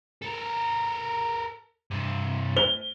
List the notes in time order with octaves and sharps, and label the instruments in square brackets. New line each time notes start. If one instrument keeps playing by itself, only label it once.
[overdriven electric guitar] A4 A#4
G2 C3
[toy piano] C5 [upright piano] G7